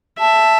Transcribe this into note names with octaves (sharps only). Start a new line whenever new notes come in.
E5 A5